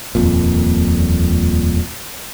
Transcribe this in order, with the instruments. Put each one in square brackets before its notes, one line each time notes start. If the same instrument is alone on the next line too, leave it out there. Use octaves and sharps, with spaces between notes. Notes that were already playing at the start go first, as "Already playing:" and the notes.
[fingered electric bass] D#1 F2 A#2